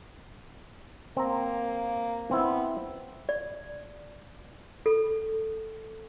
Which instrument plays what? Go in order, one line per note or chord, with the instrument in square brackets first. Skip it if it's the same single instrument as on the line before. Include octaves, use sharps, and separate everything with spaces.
[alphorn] A#3 [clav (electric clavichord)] C4 A#5
[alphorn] B3 [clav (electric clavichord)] C4 E4
[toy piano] D5
A4